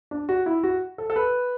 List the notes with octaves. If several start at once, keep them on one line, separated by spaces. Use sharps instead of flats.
D4
F#4
E4
F#4
A4
A4
B4